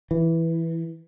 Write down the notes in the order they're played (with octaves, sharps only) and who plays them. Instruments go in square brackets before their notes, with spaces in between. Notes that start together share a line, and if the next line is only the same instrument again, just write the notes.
[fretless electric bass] E3